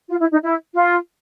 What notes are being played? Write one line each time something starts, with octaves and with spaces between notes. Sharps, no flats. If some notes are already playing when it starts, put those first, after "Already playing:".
F4
E4
D#4
E4
F4